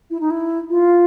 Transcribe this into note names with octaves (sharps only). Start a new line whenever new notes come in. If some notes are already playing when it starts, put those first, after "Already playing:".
E4
D#4
E4
F4